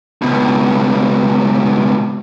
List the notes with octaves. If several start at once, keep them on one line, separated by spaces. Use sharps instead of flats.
C#2 B2